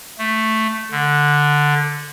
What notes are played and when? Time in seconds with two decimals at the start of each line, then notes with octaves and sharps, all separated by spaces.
0.18 A3
0.91 D3